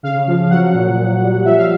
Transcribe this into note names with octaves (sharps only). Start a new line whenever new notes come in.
C#3 F5
F3
F#3 F#5
A#2
A#2
G3
F3 E5
F5